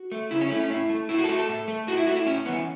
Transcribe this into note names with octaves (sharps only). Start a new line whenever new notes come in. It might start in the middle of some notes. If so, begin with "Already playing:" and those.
Already playing: F#4
A3
C#3 E4
C#4
A3 E4
C#4
A2 E4
A3
A2 E4
F#4
A4
A3 F#4
A4
A2
A3
A2 F#4
E4
A3 F#4
E4
A2 C#4
E3 B3